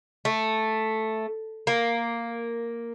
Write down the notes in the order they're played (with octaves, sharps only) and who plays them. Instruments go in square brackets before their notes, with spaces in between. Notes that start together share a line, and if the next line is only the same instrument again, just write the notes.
[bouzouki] A3
A#3